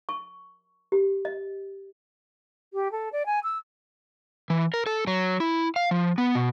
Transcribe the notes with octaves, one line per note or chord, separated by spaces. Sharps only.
C#6
G4
D#5
G4
A4
D5
G#5
E6
E3
A#4
A4
F#3
E4
F5
F3
B3
B2